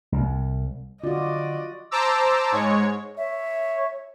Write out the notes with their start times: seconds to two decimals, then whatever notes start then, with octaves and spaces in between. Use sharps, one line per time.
0.12 C2
1.04 D3 F4 F#4 D5 D#5
1.91 C5 A5 A#5 D6 E6
2.52 G#2 G#3 C#5
3.17 C#5 E5